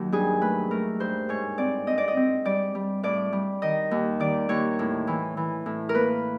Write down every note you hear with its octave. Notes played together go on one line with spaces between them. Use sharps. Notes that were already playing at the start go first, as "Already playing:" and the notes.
Already playing: D#2 D#3 F#3
G2 G#4
A3 B4
A3 A#4
G2 C5
G#2 C#5
C4 D5
C4 D#5
D5
D#5
C4
G3 D5
G3
A2 D5
G3
D#3 D#5
D#2
D#3 D5
D#2 C#5
A2
E3
E3
A2
A#4
A#3 B4